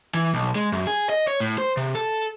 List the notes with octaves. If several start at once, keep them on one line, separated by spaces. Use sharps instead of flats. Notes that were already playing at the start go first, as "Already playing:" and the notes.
E3
B1
G#3
F#2
G#4
D#5
C#5
A2
C5
C3
A4